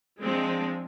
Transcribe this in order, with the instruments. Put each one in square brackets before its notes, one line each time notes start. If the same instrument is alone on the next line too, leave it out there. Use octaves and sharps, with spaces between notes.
[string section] F3 G#3 C4 D4